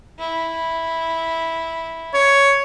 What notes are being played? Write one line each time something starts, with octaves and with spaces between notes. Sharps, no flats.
E4
C#5